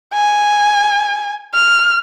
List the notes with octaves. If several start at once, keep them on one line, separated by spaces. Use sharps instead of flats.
G#5
F6